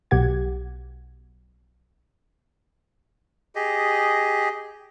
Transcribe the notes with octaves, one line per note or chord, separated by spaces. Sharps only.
B1 B2 G4 F#5 G#6
G4 G#4 D#5